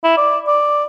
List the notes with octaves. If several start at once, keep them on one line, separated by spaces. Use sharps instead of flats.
E4
D5
D5